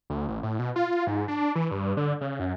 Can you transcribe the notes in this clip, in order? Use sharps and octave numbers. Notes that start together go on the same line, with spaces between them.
D2
A1
A2
B2
F4
G#2
D4
E3
G2
D3
C#3
F#2